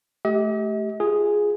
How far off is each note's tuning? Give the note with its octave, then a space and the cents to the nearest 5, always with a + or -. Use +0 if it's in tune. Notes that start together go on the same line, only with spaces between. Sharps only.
A3 -15 G4 -5 D#5 +45
F4 +0 G#4 +0